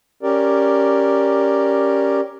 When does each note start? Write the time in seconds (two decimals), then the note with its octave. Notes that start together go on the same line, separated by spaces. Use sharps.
0.23 C#4 G4 A#4 D5